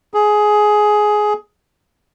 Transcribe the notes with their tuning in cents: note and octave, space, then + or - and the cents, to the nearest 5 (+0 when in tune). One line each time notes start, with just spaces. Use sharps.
G#4 +15